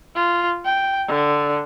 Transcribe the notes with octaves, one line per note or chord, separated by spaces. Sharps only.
F4
G5
D3